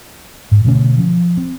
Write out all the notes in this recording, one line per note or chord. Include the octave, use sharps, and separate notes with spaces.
G#2
B2 D3 A3 C#4
F3
C4